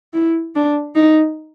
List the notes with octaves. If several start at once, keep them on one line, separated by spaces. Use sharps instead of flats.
E4
D4
D#4